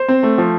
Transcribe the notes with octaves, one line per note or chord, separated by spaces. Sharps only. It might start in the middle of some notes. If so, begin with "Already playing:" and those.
Already playing: C5
C4
A3
F3